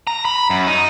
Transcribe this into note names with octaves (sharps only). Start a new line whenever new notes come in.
A#5
B5
F#2
D#4